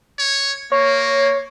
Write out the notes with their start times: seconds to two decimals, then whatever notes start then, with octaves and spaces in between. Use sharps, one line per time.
0.19 C#5
0.72 A#3 C#5